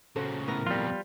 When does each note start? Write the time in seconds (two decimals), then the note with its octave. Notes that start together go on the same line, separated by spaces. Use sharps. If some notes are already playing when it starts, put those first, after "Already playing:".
0.16 A#2 C#3 F#4 A4 C5
0.47 A2 B3 A#4 A#6
0.67 F2 B2 G3 F4